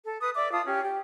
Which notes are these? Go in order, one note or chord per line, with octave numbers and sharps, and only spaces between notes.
A4
B4 D#6
D5 E5 D6
F4 A5 D#6
C#4 G4
G4